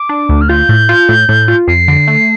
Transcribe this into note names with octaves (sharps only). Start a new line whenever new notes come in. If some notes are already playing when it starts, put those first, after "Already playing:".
Already playing: D6
D4
D2
F6
F4 G6
A2
F4
A2
A2
F4
F2 C7
D3
A3